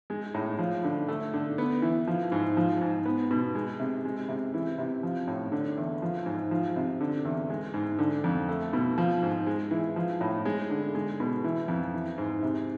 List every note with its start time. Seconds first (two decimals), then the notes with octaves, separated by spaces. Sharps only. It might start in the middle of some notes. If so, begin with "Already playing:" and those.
0.10 G#3
0.34 A2
0.59 F3
0.84 D3
1.08 A3
1.34 D3
1.58 B3
1.82 E3
2.08 F3
2.32 G#2
2.57 F3
2.81 G#2
3.05 B3
3.31 B2
3.55 G#3
3.80 C3
4.05 G#3
4.29 C3
4.54 E3
4.78 C3
5.03 F3
5.28 A2
5.52 D3
5.77 E2
6.02 F3
6.26 G#2
6.51 F3
6.76 C3
7.01 D3
7.25 E2
7.50 G#3
7.74 G#2
7.99 D3
8.24 F2
8.49 A3
8.73 B2
8.98 F3
9.23 G#2
9.47 G#3
9.71 E3
9.96 F3
10.21 A2
10.45 G#3
10.70 D3
10.95 G#3
11.20 B2
11.44 E3
11.68 F2
11.94 E3
12.18 G#2
12.43 C3